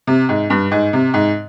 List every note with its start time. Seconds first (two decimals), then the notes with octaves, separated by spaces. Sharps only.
0.07 C3
0.29 G#2
0.50 G2
0.71 G#2
0.93 C3
1.14 G#2